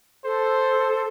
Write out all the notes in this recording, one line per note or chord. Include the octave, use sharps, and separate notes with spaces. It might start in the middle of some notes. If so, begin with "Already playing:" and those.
A4 C5